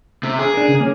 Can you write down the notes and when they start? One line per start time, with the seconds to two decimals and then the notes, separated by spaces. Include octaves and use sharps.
0.23 C3
0.39 G#4
0.54 D4 A#4
0.68 C#3
0.80 A#3 C#4